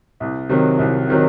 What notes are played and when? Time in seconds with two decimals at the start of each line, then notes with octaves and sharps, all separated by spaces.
0.20 C2
0.49 C3 D#3 F#3
0.79 C2
1.08 C3 D#3 F#3